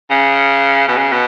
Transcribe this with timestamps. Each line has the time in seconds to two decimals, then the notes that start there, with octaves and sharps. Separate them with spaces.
0.10 C#3
0.88 B2
0.97 C#3
1.12 B2